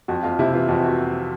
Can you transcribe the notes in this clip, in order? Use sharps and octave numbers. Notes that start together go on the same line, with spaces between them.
F2 F#4
F2 F4
C3 E4
E3 F4
F2 F#4
F#4